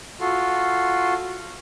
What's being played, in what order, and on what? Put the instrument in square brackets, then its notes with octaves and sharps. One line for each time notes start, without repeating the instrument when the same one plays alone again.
[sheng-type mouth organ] F4 F#4 A4 C6